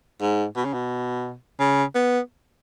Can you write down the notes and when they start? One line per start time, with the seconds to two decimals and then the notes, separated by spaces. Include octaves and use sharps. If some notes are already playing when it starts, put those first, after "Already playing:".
0.21 G#2
0.57 B2
0.65 C#3
0.74 B2
1.60 C#3
1.95 B3